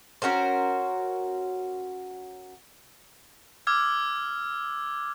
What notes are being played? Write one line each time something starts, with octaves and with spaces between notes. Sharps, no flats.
C#4 F#4 A#4 C5
D6 E6 F6 G#6